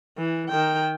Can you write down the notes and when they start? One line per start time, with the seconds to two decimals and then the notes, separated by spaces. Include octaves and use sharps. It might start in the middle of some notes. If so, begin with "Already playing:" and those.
0.18 E3
0.49 D#3 G5